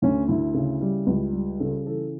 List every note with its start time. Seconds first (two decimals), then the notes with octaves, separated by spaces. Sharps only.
0.02 D2 C#4
0.28 D2 E4
0.54 C#3
0.81 G3
1.07 C#2
1.33 G3
1.60 C#3 A4
1.86 E3 A4